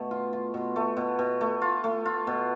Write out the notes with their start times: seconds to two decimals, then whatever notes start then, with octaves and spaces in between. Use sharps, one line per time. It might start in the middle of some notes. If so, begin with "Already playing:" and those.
Already playing: B2 A3
0.11 F4
0.33 F4
0.54 B2
0.76 A3
0.97 B2
1.19 B2
1.41 A3
1.62 F4
1.84 A3
2.05 F4
2.27 B2